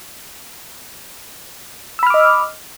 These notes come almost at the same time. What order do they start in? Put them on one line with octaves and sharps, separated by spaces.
E6 B5 F6 D6 D#5